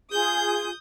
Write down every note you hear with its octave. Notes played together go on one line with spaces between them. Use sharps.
F4 G#4 D#6 G6